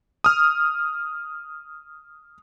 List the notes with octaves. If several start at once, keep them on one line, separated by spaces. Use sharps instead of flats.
D#6 F6